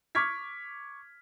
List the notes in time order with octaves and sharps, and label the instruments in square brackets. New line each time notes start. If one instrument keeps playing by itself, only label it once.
[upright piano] C#6 D6 F6 G#6 B6